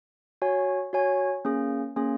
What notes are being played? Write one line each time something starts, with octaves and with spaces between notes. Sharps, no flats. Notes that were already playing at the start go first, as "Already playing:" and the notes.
F#4 C#5 G#5
F#4 C#5 G#5
A#3 C#4 G#4
A#3 C#4 G#4